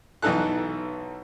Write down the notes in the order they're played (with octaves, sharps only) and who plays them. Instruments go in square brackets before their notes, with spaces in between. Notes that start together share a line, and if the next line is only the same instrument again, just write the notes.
[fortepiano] B1 E3 D#4 A4 F#6